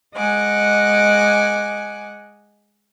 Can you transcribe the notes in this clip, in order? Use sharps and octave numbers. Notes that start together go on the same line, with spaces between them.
G#3 D#5 F#5 G#5 D6